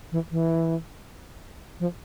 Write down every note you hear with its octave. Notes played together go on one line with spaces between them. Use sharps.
E3
E3
F3